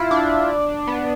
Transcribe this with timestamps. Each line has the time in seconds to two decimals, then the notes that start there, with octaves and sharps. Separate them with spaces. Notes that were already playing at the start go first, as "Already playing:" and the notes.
Already playing: E4 F4
0.11 D4
0.87 B3